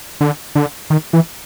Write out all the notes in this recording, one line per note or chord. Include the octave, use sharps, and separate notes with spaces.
D3
D3
D#3
E3